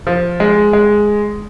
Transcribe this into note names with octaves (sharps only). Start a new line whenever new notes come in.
F3
G#3
G#3